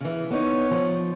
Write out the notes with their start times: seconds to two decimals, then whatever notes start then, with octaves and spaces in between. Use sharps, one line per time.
0.01 C#3 E3
0.31 B3 D#4 C#5
0.71 F3